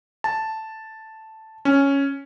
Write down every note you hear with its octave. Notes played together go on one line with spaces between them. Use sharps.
A5
C#4